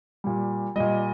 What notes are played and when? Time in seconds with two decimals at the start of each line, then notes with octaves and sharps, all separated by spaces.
0.24 A#2 G3
0.76 A#2 G3 D#5